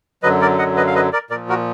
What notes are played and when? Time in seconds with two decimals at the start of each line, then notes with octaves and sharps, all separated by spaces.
0.23 F#2 D3 F#3 B4 D#5
0.41 A#4 D5
0.59 D#5 F#5
0.77 B4 D#5
0.87 F5
0.95 B4 D#5
1.13 A#4 D5
1.30 A#2 A#4 D5
1.35 F3
1.49 F#4 A#4